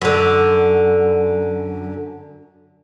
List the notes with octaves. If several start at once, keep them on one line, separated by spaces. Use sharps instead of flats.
F#2 D3